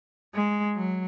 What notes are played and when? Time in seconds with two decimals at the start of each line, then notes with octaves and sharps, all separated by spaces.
0.35 G#3
0.76 F#3